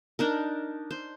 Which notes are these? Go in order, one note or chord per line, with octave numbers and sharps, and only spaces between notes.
D4 D#4 A#4
C5